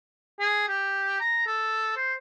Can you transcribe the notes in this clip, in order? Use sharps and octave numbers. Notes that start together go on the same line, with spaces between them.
G#4
G4
A#5
A4
C5